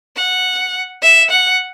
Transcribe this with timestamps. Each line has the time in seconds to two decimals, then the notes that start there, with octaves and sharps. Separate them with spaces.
0.16 F#5
1.02 E5
1.30 F#5